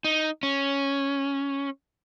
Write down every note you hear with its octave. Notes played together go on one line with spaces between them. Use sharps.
D#4
C#4